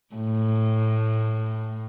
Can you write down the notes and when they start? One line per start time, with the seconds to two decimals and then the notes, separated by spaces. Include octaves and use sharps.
0.15 A2